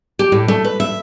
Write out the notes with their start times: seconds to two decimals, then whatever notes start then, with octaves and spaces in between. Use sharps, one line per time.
0.19 G4
0.32 A2
0.48 A3
0.64 B4
0.80 E5